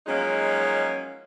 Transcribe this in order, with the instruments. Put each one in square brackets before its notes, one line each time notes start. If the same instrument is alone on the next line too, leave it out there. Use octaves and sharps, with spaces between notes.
[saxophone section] F3 F#3 G#3 A#3 C#4 D#4